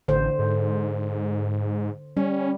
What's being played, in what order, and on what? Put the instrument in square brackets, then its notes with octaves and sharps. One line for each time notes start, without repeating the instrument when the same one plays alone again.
[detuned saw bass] A1 [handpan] D3 C5
[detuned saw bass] G#2
[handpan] G3 [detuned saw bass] C#4